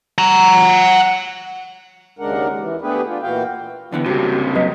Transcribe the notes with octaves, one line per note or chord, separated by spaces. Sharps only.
F#5 A#5
D#2 C#3 G#3 D4 A#4 F#5
E3
A3 B3 D4 G4 G#4 B4
D4 F4
A#2 E3 F#4 F5 G5
D3 E3 B3
C#2 G2 C3 F#4 G4
F#3 B4 D#5 B6